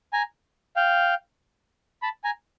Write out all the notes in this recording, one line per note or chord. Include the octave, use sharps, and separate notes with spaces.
G#5 A#5
F5 G5
A5 B5
G#5 A#5